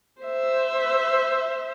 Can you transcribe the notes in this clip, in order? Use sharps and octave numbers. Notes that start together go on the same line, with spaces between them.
C5 E5